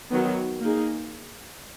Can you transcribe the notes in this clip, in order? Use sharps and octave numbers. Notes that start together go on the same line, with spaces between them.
D#3 F#3 B3
A#3 D#4 G#4